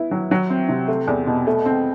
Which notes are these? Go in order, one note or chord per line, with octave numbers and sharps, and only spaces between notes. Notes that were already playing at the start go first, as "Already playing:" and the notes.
Already playing: B3 E4
F#3
F#3
C4
C3
A3
E2
B2
A3
C4